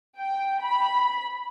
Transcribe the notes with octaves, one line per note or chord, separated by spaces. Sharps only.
G5
B5